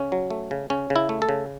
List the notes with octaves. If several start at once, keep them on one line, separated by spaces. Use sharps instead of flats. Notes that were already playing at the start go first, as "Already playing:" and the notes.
Already playing: C#3 C#4
F#3
A3
C#3
C#3 C#4
C#3
E4
A3
A4
C#3